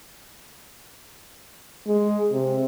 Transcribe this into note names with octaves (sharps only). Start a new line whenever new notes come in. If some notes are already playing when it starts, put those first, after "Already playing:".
G#3
C3